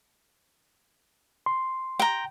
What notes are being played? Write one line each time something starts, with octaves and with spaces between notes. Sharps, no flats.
C6
G5 A#5